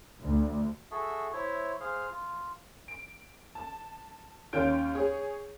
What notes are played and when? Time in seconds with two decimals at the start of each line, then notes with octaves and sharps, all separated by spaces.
0.22 D2
0.91 F#4 G#4 A4 E5
1.33 E4 C5 C#5 E5
1.80 G#4 C5 F5
2.09 F4
2.88 D7
3.55 A5
4.53 D#2 C#4 F4 G6 D7
4.95 G#4 C#5